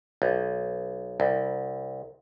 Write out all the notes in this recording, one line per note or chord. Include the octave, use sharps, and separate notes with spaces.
B1
C2